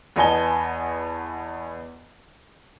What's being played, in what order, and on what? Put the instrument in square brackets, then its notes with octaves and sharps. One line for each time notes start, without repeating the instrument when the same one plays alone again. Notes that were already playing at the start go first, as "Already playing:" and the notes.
[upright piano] E2 B3 D#5 G#5 A5 G7